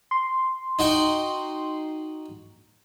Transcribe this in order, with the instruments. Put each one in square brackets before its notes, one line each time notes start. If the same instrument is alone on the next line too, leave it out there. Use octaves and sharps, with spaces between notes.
[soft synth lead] C6
[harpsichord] D#4 F#4 G5